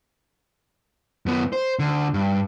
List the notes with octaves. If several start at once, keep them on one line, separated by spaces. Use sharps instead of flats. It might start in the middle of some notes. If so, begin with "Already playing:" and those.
F#2 B3
C5
D2 D3
G2